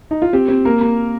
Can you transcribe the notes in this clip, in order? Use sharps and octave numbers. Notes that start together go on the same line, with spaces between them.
D#4
F4
C4 G4
C4
A#3 A#4
A#3